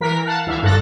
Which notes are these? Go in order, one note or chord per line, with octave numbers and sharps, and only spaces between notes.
E3 A#4 B6
F5 F#5 A5
D2 E3 E5 F5
G#1 G2 A4 F#6 A6 A#6